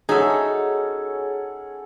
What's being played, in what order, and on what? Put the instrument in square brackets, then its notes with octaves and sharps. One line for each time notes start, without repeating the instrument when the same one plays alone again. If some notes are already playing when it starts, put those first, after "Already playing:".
[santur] C#4 F#4 A4 [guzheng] D#4 E5 [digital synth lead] G#4